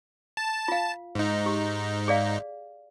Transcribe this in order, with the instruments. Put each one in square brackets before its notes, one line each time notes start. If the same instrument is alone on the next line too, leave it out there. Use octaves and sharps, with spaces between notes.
[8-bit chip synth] A5
[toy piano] F4 F5
[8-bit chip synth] G#2 D#4
[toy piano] G4
G#4 D5 F5